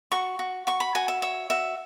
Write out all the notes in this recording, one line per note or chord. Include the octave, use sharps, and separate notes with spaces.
F#4 C#6
F#4
F#4 C#6
B5
F#4 G#5
E5
C#5 E5
F#4 E5